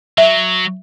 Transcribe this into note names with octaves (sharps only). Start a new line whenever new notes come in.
F#3 E5